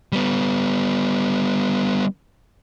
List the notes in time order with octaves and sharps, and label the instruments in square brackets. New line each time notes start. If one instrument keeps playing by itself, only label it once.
[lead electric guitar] G3 B3